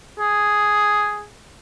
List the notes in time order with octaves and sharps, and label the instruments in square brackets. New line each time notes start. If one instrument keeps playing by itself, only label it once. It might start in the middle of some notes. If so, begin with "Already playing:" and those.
[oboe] G#4